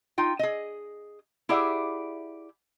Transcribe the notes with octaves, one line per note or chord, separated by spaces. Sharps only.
D#4 F4 G5
G#4 D#5
E4 G4 G#4 D5 E5 F#5